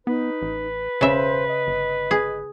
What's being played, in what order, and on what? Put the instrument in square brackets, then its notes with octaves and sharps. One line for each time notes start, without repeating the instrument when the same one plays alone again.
[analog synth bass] B3 [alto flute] D#4 [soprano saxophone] B4
[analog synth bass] A1
[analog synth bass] E1 [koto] C#3 E5 [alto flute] C5
[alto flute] D#5
[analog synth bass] G1
[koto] G#4